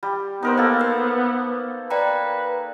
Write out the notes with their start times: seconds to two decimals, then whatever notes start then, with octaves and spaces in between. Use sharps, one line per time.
0.03 G3
0.43 B3 D#4 A#4 C5
0.57 A#3 A4
0.79 B4 E6
1.91 B4 D5 G5 A#5